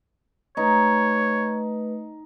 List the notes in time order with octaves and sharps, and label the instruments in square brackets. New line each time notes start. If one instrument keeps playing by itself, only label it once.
[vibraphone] A3 B4 [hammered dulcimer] D#4 [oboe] C#5